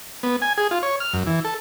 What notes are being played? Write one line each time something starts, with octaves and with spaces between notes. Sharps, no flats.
B3
G#5
G#4
F4
C#5
F6
F#2
E3
A4